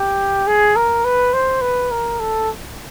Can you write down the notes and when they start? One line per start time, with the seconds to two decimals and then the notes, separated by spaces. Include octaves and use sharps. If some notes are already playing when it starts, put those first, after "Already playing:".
Already playing: G4
0.47 G#4
0.76 A#4
1.05 B4
1.34 C5
1.62 B4
1.91 A#4
2.20 A4